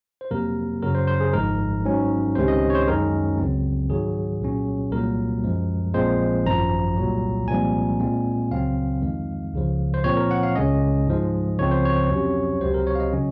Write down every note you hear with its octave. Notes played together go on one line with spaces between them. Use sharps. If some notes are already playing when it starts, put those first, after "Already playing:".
C5
F2 C3 F#3 A#3 A#4
F#2 C#3 F#3 A#4
C5
C5
G#4
G#1 G#2 F3 G#3 A#4
G#2 F#3 C#4
C#2 C3 D#3 G#3 C#4 C5
D#5
C#5
C5
F#2 D#3 G#3 C#4 A#4
C#2 C#3 F#3 C4
G#2 D#3 F#3 G#4
C2 A#2 F#3 C#4
C2 A#2 F#3 A#3 A#4
F#2 F3 G#3
A#1 A#2 F3 G#3 C4 C5
G#1 F#2 F3 A#5
C2 A#2 F#3
C2 A#2 F3 G#3 C4 G#5
A#2 G#3 C4
C#2 C#3 F#3 C4 F5
F2 D#3 G#3
C#2 C#3 F3
C5
A#2 F3 C4 C#5
A#4
F#5
F5
C#2 C#3 G#3 C#4 D#5
G#2 F3 G#3
C#2 C#3 F3 C4 C#5
C5
C#5
F2 C3 F#3 C#4
C#2 C3 F#3 C4 C5
A#4
C#5
F5
D#5
C#3 F#3 C#4